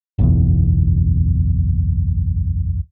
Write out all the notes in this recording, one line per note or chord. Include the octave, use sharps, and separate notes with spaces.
F#1 B1 E2